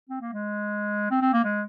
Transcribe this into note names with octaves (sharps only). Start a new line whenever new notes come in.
C4
A#3
G#3
C4
C4
A#3
G#3